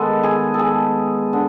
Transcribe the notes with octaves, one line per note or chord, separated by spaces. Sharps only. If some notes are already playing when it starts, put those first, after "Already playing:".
Already playing: D#3 G#3 B3 A4
G#4
A4
G#4
D3